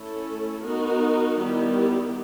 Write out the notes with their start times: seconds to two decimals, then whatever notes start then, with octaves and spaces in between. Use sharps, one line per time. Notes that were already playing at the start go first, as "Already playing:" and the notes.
Already playing: A3 C#4 E4 A4
0.63 B3 D#4 F#4 A#4
1.37 D#3 G3 B3 E4 G4